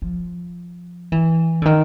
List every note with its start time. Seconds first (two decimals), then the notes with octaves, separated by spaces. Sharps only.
0.02 F3
1.12 E3
1.62 D3
1.65 D#3